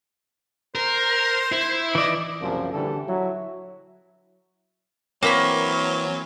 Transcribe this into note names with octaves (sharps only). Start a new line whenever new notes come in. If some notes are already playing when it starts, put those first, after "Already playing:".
A#4 C5
E4
E3 D5 D#5
C2 F#2 A#2 C#3 F3
A#1 D3 E3 G3 A4
F#3 E4
E3 F#3 A#3 C4 B5 C#6